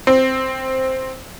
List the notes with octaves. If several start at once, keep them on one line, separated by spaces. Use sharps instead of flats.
C4